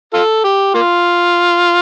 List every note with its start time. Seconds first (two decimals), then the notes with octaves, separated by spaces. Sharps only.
0.14 F4 A4
0.44 G4
0.74 A#3 F4